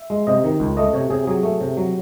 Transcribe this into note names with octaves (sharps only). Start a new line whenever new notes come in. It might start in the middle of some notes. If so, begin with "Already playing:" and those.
Already playing: E5
G#3
C3 D#5
D#3
C#2
A3 D#5
C3 C#5
C3 G#4
F#3 G#4
A3
C3
F#3